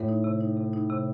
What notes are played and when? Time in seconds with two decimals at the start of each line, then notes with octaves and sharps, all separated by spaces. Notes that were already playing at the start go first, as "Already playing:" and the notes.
Already playing: A2
0.09 D#4
0.24 C3
0.40 D#4
0.57 C3
0.73 D#4
0.90 C3